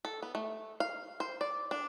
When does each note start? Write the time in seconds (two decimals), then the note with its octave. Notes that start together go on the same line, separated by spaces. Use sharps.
0.05 A4
0.22 B3
0.35 A3
0.80 F5
1.20 C5
1.41 D5
1.71 D4